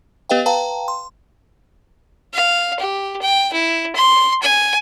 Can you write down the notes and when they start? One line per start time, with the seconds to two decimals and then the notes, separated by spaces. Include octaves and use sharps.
0.29 B3 G4 B4 D#5 F5 G5
0.46 B4 F5 G5 A5 A#5
0.88 C6
2.33 F5
2.79 G4
3.21 G5
3.53 E4
3.95 C6
4.42 G#5